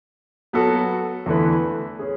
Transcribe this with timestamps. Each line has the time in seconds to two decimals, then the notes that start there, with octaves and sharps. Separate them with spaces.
0.53 F#3 B3 F#4 A4
1.26 E2 D3 A3 E4 B4
1.99 C#4 G#4